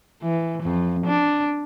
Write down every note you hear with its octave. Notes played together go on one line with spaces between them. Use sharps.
E3
F2
D4